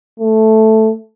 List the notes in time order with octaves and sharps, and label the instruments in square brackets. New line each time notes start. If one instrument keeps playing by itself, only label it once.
[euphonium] A3